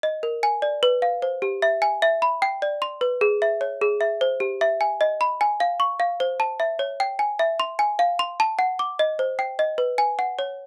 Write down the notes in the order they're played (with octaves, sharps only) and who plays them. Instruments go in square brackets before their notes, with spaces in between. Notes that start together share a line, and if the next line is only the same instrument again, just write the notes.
[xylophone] D#5
A#4
G#5
D5
B4
F5
C5
G4
E5
G#5
E5
B5
G5
D5
C6
B4
G#4
E5
C#5
G#4
E5
C5
G4
E5
G#5
D#5
B5
G#5
F5
C#6
F5
C5
A5
E5
C#5
G5
G#5
E5
C6
G#5
F5
C6
A5
F#5
D6
D#5
C5
G5
D#5
B4
G#5
F#5
C#5